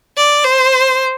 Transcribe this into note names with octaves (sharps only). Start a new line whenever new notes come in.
D5
C5